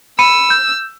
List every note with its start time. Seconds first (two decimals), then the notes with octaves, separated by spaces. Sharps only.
0.19 B5 E6 C#7 D#7
0.50 G6